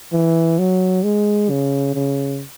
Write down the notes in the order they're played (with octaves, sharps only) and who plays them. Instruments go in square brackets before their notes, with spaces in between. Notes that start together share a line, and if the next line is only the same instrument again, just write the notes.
[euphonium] E3
F#3
G#3
C#3
C#3